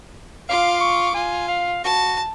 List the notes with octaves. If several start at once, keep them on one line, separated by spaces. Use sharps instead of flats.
F4 F5 D6
C#6
F4 G#5
F5
F#4 A5